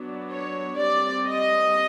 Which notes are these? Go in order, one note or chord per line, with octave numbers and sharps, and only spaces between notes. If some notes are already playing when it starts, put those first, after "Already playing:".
Already playing: F#3 B3 D4
C#5
G3 C4 D5
D#5